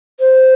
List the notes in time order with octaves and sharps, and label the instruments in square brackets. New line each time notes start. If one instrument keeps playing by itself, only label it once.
[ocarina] C5